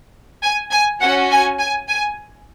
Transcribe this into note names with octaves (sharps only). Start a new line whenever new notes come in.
G#5
G#5
C#4 F#4 F#5
G#5
G#5
G#5